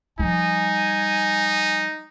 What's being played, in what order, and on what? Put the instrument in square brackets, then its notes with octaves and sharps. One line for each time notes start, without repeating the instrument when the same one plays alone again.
[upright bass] F3 G3 [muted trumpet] D#4 [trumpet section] G#5